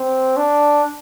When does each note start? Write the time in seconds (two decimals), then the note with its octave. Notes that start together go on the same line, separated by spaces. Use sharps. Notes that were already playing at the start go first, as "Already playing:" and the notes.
Already playing: C4
0.37 D4